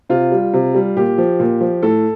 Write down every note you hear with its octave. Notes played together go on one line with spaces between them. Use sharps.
C3 F4
G3
C3
G3
A#2 G4
F3
A#2
F3
A2 A4